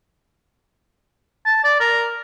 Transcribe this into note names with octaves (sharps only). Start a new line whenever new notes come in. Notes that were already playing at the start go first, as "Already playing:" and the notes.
A5
D5
A#4